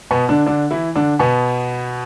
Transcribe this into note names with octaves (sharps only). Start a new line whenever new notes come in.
B2 B3
D3 D4
D3 D4
E3 E4
D3 D4
B2 B3